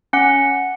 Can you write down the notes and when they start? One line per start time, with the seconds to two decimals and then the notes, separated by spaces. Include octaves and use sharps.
0.13 C#4 F#5